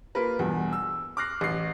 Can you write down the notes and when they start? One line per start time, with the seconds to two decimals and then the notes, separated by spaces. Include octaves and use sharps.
0.15 A#3 F4 A#4 B4
0.39 E2 G2 B2
0.73 E6
1.17 D6 F6 F#6 A#6 C7
1.41 A1 C7